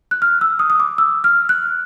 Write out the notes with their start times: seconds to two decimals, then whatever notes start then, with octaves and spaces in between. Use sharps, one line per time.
0.11 F#6
0.22 F6
0.41 E6
0.59 D#6
0.70 D#6
0.80 D6
0.98 E6
1.24 F6
1.49 F#6